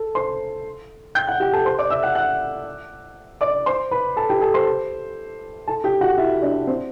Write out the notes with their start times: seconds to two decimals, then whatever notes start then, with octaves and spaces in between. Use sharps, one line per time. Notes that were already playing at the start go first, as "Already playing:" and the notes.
Already playing: A4
0.15 C5 C6
1.15 G5 G6
1.27 F#5 F#6
1.40 G4 G5
1.53 A4 A5
1.65 C5 C6
1.79 D5 D6
1.90 E5 E6
2.03 F#5 F#6
2.15 F#5 F#6
3.41 D5 D6
3.66 C5 C6
3.91 B4 B5
4.16 A4 A5
4.29 G4 G5
4.41 A4 A5
4.54 C5 C6
5.68 A4 A5
5.84 G4 G5
6.01 F#4 F#5
6.17 E4 E5
6.42 D4 D5
6.67 C4 C5